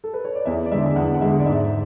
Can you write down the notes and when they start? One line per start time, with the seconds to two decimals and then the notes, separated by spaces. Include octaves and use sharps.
0.04 A4
0.14 B4
0.25 C#5
0.35 D5
0.45 E2 E5
0.66 D5
0.71 D3 G#3 E5
0.86 E5
0.96 E2 F#5
1.14 F#5
1.21 D3 G#3 E5
1.40 D5
1.46 G#2 E5